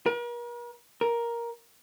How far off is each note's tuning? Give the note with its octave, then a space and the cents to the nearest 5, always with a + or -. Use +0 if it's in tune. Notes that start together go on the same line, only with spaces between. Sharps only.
A#4 +45
A#4 +10